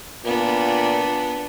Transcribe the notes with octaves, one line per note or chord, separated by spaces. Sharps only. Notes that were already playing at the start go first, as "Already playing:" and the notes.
A#2 B3 D4